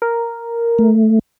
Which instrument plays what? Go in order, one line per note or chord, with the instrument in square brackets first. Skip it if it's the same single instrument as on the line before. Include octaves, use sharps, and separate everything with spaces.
[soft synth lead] A#4
[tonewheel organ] A3